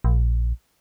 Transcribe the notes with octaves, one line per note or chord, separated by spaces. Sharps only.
A#1